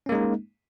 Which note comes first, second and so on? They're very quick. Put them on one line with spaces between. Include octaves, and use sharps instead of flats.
C#4 A#3 G#3 D#4